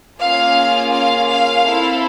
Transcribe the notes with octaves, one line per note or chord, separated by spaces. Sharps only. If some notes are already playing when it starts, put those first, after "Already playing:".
A#3 C#4 F4 G#4 F5
F5
F5
C4 E4 A4